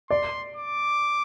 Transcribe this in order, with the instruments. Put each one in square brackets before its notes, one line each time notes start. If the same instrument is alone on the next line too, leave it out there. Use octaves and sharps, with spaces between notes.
[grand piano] D5 [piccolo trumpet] C6
[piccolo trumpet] D6